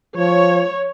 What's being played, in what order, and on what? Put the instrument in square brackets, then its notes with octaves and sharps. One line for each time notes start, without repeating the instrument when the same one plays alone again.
[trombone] F3 [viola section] C#5